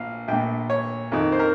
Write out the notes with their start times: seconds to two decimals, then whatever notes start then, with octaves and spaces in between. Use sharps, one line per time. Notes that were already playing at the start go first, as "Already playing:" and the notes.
Already playing: A#1 A#2 F5
0.28 A#1 A#2 G5
0.70 C#5
1.12 F2 D#3
1.32 C5
1.39 A#4